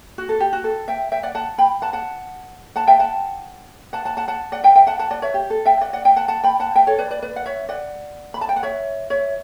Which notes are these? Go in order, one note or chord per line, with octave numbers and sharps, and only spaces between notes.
F#4
A4
G4
F#4
A4
E5 G5
E5 G5
D5 F#5
F#5 A5
G5 B5
F#5 A5
F#5 A5
F#5 A5
E5 G5
F#5 A5
F#5 A5
F#5 A5
F#5 A5
F#5 A5
D5 F#5
E5 G5
E5 G5
F#5 A5
F#5 A5
D5 F#5
C#5 E5
G4
A4
E5 G5
D5 F#5
D5 F#5
E5 G5
F#5 A5
F#5 A5
G5 B5
F#5 A5
E5 G5
A4 C#5
B4 D5
B4 D5
B4 D5
F#5
C#5 E5
D5 F#5
B5
A5
G5
F#5
C#5 E5
C#5 E5